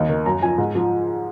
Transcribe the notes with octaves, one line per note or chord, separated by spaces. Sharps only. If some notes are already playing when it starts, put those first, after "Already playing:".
Already playing: D#2 D#5
D#3
F#2 A#5
F3 G#5
G#2
F3